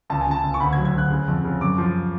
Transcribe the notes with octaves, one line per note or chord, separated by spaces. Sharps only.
C#2 A5
G#5
C#2 A5
C#2
C#6
D2 B5
G#6
F#3
G#6
D2 F#6
C#3
F2
C#3
F#2 D6
F3